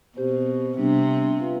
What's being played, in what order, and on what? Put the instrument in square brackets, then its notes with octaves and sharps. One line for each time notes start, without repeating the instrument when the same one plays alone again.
[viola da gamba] B2 [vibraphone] C4 G4 C5
[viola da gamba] C3 [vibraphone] G3 B3 D4 G4
[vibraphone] F4 B4 F5